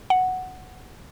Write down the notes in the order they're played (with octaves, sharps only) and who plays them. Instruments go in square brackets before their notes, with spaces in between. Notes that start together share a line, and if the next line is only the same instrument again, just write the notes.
[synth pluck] F#5